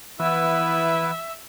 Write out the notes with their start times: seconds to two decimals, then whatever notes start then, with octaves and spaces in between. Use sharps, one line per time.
0.20 E3 B3 E4 B4 E5